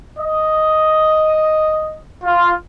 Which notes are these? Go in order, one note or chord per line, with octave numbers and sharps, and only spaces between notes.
D#5
F4